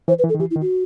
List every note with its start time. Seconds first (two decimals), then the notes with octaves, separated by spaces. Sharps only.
0.08 E3 C5
0.19 B4
0.24 E3
0.29 A4
0.35 D#3
0.40 E3 G4
0.51 E4
0.56 D#3
0.61 F#4